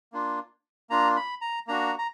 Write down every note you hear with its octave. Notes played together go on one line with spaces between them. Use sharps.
A#3 D4 F4
A#3 D4 F4 A#5
B5
A#5
A#3 D4 F#4 A#5
A#5